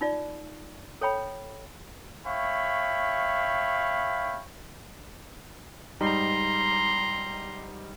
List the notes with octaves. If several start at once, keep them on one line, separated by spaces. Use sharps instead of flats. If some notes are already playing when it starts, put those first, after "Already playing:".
D#4 F4 D5
A4 C#5 G5 B5
C#5 E5 F5 G5 B5 C#6
G#2 G3 D#4 A#5 C6